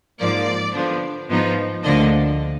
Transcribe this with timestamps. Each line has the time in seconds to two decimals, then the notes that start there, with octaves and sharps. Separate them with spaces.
0.19 G#2 F3 A#3 D5
0.74 D3 F3 B3 D4
1.29 G#2 F3 B3 D#4
1.83 D2 D3 F3 A#3 D4 D#5